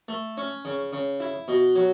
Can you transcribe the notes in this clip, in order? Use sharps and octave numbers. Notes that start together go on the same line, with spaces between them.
A3
C#4
C#3
C#3
E4
B2
F#3